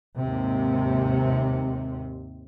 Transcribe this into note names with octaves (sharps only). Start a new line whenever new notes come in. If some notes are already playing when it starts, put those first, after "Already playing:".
D#2 G#2 C3